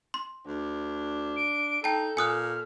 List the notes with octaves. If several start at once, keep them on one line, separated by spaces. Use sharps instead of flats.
C6
D2 D4
D7
D#4 A4 G5 A5 G6
A#2 G#5 D#6 F6 F#6